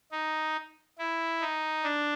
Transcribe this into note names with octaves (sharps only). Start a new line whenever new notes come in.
D#4
E4
D#4
D4